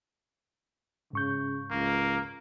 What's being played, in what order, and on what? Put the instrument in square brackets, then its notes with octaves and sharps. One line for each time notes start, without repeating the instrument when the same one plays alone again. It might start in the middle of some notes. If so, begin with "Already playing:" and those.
[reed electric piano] G#2 C#6 G6 [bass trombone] C#3
[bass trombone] C#2 [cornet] A#3